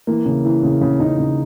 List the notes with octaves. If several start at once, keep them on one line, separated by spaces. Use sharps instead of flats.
E3 A#3
C#3
E3
C#3
C#3
C#3 D#4
C#3